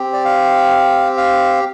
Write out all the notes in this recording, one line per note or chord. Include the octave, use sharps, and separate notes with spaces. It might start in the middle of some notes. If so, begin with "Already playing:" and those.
Already playing: C4 G4
D5
F5
F5